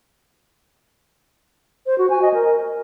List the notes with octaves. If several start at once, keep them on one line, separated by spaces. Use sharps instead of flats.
C5
F#4
G#5
D#5
A#4